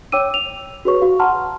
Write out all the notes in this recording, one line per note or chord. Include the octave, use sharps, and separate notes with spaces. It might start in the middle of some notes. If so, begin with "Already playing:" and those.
C#5 G5 D6 E6 D#7
F7
F#4 G#4 B4 C#5 C#6
F#4 F5
F#5 A5 A#5 C6 F6